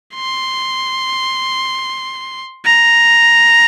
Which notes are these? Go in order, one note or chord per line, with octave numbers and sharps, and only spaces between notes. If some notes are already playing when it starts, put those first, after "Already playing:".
C6
A#5